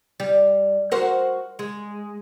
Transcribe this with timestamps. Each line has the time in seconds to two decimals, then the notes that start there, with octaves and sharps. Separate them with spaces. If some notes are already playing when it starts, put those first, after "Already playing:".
0.20 G3
0.91 F#4 A#4 C5
1.59 G#3